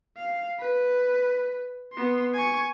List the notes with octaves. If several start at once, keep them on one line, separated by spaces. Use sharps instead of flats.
F5
B4
B3 C6
G#5 C#6